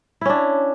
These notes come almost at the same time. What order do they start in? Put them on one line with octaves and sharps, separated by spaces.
E4 C#4 D4